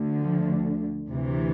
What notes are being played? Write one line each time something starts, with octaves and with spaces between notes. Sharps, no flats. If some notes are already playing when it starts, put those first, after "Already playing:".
Already playing: D2 D3
F3
D2 C3 E3